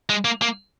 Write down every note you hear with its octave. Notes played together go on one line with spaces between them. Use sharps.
G#3
A#3
A#3